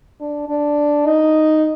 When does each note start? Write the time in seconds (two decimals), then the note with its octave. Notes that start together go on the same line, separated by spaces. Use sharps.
0.20 D4
0.49 D4
1.06 D#4